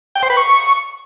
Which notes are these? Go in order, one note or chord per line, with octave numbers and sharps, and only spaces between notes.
G5
C5
B4
C#6